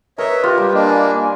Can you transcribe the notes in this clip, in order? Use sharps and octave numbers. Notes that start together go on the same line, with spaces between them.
A#4 B4 C#5 D#5 E5
F4 G4
G3
A#3 D4 D#5
G#5